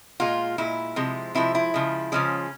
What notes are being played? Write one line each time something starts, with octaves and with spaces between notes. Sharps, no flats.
A#2 G#3 F4
A#2 G#3 E4
C3 F3 G#3
C3 F3 G#3 E4
E4
C#3 F3 G#3
C#3 F3 G#3 C#4